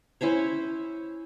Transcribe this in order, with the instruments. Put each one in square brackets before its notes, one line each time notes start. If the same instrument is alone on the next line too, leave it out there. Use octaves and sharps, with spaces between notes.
[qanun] C#4 E4 C5 C#5